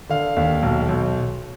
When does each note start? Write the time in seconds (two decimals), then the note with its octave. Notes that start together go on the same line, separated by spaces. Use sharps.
0.09 D3 F5
0.37 D#2
0.63 B1
0.88 B1